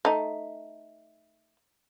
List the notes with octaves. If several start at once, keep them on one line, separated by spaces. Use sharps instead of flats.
A3 D#4